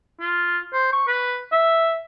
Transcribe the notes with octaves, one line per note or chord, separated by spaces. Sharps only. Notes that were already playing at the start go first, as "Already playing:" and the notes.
F4
C5
C#6
B4
E5